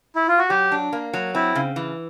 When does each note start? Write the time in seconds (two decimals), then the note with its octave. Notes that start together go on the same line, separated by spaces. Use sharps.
0.16 E4
0.28 F4
0.38 F#4
0.49 F#3 G4
0.72 D4
0.92 A#3
1.13 F#3
1.35 C4 E4
1.55 C#3
1.76 E3